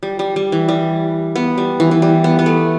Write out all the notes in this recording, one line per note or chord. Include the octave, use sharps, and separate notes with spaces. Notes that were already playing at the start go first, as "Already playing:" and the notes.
G3
G3
G3
E3
G3
B3
G3
E3
E3
G3
B3
B3
A3